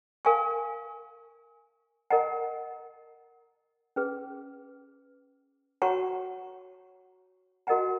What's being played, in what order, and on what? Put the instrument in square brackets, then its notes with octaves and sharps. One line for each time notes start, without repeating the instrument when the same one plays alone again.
[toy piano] A#4 F5 G#5 C#6
A#4 D#5 F#5 A#5
C#4 G#4 B4
F#4 C#5 F#5 A#5 C#6
F#4 A#4 D#5 F#5 A#5